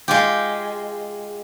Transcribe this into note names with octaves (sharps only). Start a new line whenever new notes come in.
G#3 F4 G4